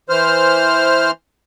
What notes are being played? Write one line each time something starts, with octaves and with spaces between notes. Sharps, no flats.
E3 C5 F6